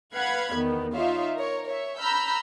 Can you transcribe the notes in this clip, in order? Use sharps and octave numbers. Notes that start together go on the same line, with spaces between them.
B4 F5 F#5 B5 F#6 G#6
E2 D#3 B3
D#4 F4 C#5 E5 F5
A#4 C#5
C#5 E5
A#5 B5 E6 F6 G6